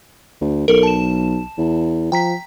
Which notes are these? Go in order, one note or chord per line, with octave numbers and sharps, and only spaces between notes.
D2
B1 A4 A#4
A5 E7
E2
F3 G5 A#5 B6